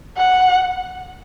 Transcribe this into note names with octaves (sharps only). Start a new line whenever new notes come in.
F#5